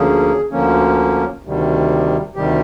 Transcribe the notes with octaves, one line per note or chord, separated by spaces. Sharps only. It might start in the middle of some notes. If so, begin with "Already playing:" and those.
Already playing: D2 D3 F3 A#3 C#4 G#4
D2 D3 F3 A#3 C#4
D2 C3 D#3 G3
D2 C3 D#3 G3 G4